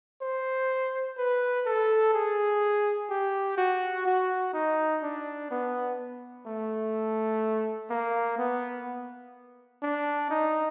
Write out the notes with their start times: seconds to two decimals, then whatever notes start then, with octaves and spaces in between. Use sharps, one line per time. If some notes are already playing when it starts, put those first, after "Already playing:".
0.22 C5
1.18 B4
1.66 A4
2.13 G#4
3.10 G4
3.58 F#4
4.06 F#4
4.54 D#4
5.03 D4
5.51 B3
6.46 A3
7.90 A#3
8.38 B3
9.83 D4
10.30 D#4